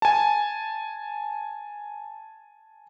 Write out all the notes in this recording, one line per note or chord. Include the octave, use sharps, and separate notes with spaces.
G#5 A5